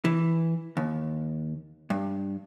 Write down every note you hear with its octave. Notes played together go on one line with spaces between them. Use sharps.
E3
D#2
G2